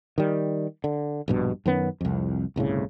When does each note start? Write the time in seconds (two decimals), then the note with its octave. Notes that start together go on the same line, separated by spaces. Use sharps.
0.18 D#3 G3
0.84 D3
1.28 A#1 G2 B2
1.66 F#2 D#3 B3 C#4
2.01 C2 F2
2.56 G1 C2 A2 C#3